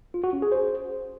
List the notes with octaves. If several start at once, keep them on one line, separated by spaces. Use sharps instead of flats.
F4
F#4
C#4
G#4
C5